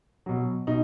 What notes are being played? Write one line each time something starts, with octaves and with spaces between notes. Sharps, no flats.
B2 F#3
B2 D#4